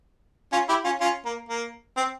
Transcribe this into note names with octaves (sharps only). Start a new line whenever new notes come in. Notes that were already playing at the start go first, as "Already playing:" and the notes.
C#4 F4
E4 G4
C#4 F4
C#4 F4
A#3
A#3
C4